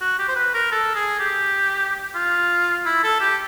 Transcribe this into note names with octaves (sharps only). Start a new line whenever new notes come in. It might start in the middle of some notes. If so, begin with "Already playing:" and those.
F#4
G4
C5
B4
A#4
A4
G#4
G4
F4
E4
A4
G4